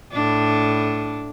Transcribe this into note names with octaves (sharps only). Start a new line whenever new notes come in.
A2 D4